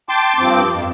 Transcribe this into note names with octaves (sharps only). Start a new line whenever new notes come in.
G5 A5 C6 D6
G2 F3 C4 D6
F2